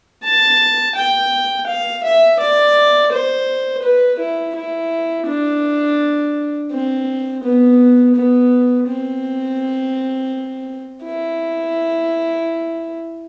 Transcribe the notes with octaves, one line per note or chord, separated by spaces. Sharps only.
A5
G5
F5
E5
D5
C5
B4
E4
E4
D4
C4
B3
B3
C4
E4